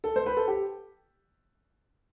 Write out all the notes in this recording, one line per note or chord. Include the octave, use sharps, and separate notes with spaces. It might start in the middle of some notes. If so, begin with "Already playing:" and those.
A4
C5
B4
A4
G4